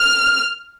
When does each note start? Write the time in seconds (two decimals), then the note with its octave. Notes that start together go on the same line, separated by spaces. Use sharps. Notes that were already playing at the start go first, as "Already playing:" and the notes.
Already playing: F6